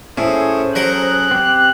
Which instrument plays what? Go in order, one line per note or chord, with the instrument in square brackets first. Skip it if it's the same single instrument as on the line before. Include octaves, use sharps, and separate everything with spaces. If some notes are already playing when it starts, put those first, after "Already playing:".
[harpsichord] A2 [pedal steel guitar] C#4 G#4 A4 [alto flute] C5
[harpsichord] F#3 A#4 [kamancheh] F#6
[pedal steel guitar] C4 G4